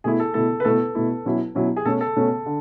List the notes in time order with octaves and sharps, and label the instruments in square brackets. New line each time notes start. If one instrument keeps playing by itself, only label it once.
[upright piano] B2 A3 E4 [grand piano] G#4
[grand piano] A4
[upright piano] B2 A3 E4 [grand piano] A4
[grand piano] B4
[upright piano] B2 A3 E4 [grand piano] A4
[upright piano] B2 A3 E4
B2 F#3 C#4 E4
B2 F#3 C#4 E4
[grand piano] G#4
[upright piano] B2 A3 C#4 [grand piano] A4
[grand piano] A4
[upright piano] B2 A3 C#4
D3